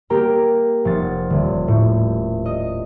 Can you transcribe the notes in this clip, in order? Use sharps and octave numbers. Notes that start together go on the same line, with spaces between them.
A#3 G4 A#4 G5 A#5
F1 A6
D#1
A2
D#5